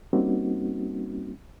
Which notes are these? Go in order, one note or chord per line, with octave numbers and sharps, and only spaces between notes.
G3 A#3 C4 C#4 D#4 F#4